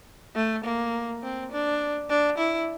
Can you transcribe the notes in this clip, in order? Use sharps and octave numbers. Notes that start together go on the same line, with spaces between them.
A3
A#3
C4
D4
D4
E4